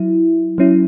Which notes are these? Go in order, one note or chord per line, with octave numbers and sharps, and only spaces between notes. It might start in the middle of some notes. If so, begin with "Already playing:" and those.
Already playing: F#3 E4
F#3 C#4 E4